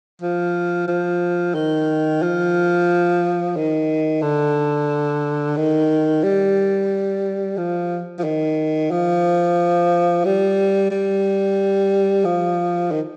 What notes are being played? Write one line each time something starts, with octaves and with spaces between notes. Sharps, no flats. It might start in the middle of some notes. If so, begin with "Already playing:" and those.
F3
F3
D#3
F3
D#3
D3
D#3
G3
F3
F3
D#3
F3
G3
G3
F3
D#3